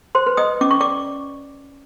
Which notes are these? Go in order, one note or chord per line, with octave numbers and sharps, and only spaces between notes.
C5 C6
B4
D#5 D#6
C#4 D6
C#6
D5 D6